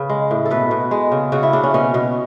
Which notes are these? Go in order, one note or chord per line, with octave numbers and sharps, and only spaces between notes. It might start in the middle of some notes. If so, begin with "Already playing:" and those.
Already playing: C#3 B4
G#3
A2
A4
B2 B4
B2
G#3
C#3
C#3 F#4
E4
C#3 D4
C#4
B2 C#4
B2